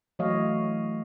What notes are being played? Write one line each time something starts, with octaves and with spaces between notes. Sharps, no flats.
E3 F#3 A3 C#5 D#5 F5